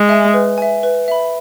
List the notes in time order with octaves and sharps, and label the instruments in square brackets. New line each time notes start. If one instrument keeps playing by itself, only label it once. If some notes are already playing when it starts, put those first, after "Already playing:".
Already playing: [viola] G#3
[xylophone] E5 G#5
B4
E5 G#5
B4
E5 B5